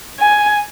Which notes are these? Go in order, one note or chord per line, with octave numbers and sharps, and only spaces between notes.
G#5